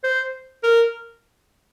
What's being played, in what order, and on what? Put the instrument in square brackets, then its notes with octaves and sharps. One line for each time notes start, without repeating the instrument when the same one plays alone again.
[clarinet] C5
A#4